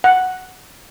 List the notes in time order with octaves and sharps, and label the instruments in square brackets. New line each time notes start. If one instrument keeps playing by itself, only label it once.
[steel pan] F#5